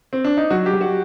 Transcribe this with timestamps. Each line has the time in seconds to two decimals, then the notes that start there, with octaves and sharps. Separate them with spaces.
0.13 C4
0.25 D4
0.37 D#4
0.50 F#3 F#4
0.66 G4
0.73 F#3
0.81 F#4